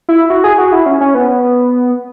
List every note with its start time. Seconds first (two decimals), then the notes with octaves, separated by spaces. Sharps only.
0.09 E4
0.30 F#4
0.44 G#4
0.58 F#4
0.72 E4
0.86 C#4
1.01 C#4
1.15 B3